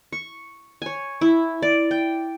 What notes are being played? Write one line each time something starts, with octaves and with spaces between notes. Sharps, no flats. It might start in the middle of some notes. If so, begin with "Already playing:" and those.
C#6
C#5 G#5
E4
D5
G5